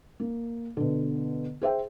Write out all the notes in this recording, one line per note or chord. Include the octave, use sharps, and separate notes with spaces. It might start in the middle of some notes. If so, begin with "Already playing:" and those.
A#3
B2 D3
G#4 C5 E5 G5